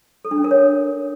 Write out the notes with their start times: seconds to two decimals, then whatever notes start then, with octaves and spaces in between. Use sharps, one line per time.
0.25 A4
0.31 D4
0.38 C#4
0.44 A#4
0.51 C#5